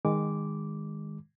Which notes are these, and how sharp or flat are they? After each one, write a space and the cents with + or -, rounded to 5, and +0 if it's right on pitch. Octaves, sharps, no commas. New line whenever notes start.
D#3 +0 G#3 -20 D6 -10